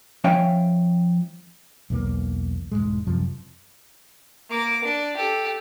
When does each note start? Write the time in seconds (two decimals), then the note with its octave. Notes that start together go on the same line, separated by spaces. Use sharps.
0.24 F3 C#4 C#5 E5 F5 G5
1.90 B1 E2 D#3 A#3
2.72 E1 D#2 G#2 G#3
3.07 F#2 C3 F3
4.50 A#3 D6
4.84 D4
5.17 G4 A4